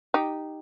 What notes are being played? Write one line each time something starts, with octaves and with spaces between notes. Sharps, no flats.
D#4 G4